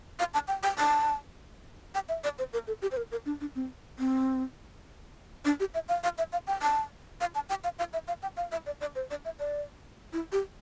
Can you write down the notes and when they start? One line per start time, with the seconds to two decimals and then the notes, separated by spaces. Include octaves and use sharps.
0.19 F5
0.34 A5
0.48 G5
0.63 G5
0.78 A5
1.95 G5
2.09 E5
2.24 D5
2.39 C5
2.53 A#4
2.67 A4
2.82 G4
2.91 C5
2.97 A#4
3.12 A#4
3.26 D4
3.41 D4
3.55 C4
3.99 C4
5.45 D4
5.60 G4
5.74 E5
5.89 F5
6.04 F5
6.18 E5
6.33 F5
6.47 G5
6.62 A5
7.21 F5
7.35 A5
7.49 G5
7.64 F5
7.79 F5
7.93 E5
8.08 F5
8.23 G5
8.37 F5
8.52 E5
8.66 D5
8.81 D5
8.96 C5
9.10 D5
9.25 E5
9.40 D5
10.13 E4
10.32 G4